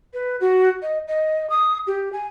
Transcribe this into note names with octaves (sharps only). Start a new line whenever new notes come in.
B4
F#4
D#5
D#5
D#6
G4
G#5